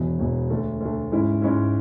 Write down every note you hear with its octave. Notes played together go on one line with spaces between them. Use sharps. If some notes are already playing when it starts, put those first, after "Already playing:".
Already playing: E1 E2 B2
E1 E2 B2
D2 D3 A3
D2 D3 A3
G#2 G#3 C#4 E4
G#2 G#3 C#4 E4